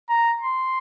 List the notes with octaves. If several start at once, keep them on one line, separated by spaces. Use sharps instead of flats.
A#5
C6